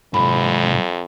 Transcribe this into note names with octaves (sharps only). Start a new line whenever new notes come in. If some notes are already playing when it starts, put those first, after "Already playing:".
F2 G#2 C3 B5